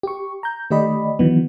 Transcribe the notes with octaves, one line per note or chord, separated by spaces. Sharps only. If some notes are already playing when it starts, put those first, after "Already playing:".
G4 C#6
A#5 G6
D#3 A3 G4 D5 D#5 B5
D#3 E3 F#3 B3